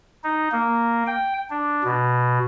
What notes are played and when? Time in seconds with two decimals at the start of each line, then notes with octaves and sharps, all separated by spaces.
0.24 D#4
0.52 A#3
1.07 G5
1.50 D4
1.84 B2